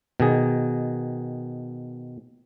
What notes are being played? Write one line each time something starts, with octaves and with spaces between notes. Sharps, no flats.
B2 D#3 G#4